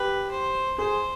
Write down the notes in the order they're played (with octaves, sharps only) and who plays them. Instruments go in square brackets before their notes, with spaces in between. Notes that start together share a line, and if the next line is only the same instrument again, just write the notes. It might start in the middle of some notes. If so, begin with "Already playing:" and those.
Already playing: [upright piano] G4 [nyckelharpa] B4
[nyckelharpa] C5
[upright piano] G#4 [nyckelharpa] C5